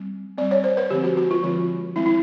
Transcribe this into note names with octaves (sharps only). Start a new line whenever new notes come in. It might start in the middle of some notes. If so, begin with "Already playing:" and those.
Already playing: G3 C4
G3 C4 D5
C#5
C5
B4
D3 F3 G#3 C4 G4
F#4
F#4
F4
D3 F3 G#3 C4
D#3 G#3 C4 E4
E4